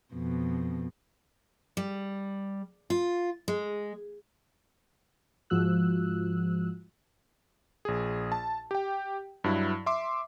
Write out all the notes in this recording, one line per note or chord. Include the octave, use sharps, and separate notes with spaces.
F2 B2
G3
F4
G#3
G#2 F3 G#3 F#4 E6 F#6
A#1 G#4
A5
G4 G5
G2 F#3 E4
E5 C6 D6